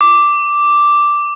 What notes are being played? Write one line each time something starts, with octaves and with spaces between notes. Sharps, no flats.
D6